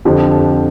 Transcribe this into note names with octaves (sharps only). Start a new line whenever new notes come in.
F2 D3 F3 C4 G4